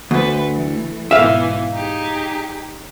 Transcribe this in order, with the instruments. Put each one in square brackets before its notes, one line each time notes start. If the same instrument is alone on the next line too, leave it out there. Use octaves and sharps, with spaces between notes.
[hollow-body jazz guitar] D2 [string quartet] A3 B4 C5
[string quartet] E3 A3
[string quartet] G#2 B2 E3 [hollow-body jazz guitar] E5 F5
[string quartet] D#4 G4 G#4